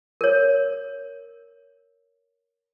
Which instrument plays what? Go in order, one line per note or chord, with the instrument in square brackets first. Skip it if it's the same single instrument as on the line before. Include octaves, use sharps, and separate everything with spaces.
[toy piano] A#4 C#5